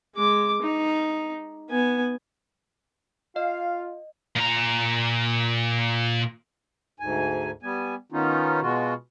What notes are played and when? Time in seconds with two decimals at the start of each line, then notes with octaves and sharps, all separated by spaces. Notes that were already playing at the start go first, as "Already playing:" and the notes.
0.15 G#3 D6
0.62 D#4
1.70 B3 G#5
3.36 F4 D#5 F5
4.36 A#2 A#5
7.00 D2 G#2 G#5
7.63 G3 B3 G#5
8.12 D#3 B3 C#4 D#4 F4
8.61 B2 G#3 F4 F#4